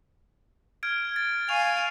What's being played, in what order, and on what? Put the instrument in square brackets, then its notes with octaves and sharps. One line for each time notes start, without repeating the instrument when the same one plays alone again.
[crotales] F6 G#6 D7
A6
[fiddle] F5 G#5 [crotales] C#6 F7